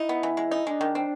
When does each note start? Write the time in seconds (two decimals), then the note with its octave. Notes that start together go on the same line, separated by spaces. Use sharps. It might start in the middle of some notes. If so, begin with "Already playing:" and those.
Already playing: D#4 E4
0.09 B3
0.23 E3
0.37 G#3
0.51 D#4
0.66 G#3 D4
0.81 D#3
0.95 C4